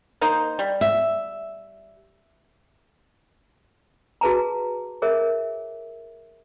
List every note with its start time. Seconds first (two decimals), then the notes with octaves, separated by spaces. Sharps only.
0.21 A#3 D#4 C5
0.59 G3
0.81 E5
4.21 F#4 G#4 B4 A5 A#5
5.02 G#4 A#4 C#5 E5